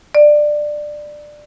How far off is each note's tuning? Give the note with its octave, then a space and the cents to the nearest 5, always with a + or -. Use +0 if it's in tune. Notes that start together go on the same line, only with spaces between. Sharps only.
D5 +15